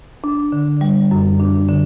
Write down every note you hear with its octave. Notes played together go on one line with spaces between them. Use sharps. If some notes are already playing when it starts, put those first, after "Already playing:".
D4
D3
G3
F#2
D4
D3